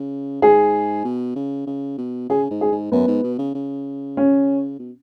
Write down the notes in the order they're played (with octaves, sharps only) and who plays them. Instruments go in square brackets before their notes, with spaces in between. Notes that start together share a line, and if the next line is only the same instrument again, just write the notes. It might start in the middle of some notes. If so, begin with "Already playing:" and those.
Already playing: [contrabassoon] C#3
[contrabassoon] G#2 [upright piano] G#4
[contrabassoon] B2
C#3
C#3
B2
[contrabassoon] C#3 [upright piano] G#4
[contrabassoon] G#2
[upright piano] G#4
[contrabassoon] G#2
[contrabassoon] F#2 [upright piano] B3
[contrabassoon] G#2
B2
C#3
C#3
[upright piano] C#4
[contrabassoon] B2